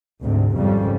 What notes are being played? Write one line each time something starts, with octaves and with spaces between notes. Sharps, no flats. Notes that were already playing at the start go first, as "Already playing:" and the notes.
D2 G#2 C3
G#1 F2 C#3 G3